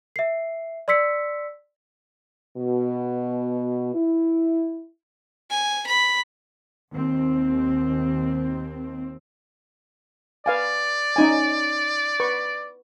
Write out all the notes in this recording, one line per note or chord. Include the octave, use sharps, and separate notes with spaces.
E5 C7
D5 C6 E6 B6 C#7
B2
E4
G#5
B5
D#2 C4
B4 D5 F5 G#5
C#4 D#4 G#5
B4 C#6